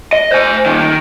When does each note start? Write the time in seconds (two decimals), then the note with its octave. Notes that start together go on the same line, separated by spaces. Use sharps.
0.13 D#5
0.32 C5 G#5
0.66 A#2 D#3
0.79 D#3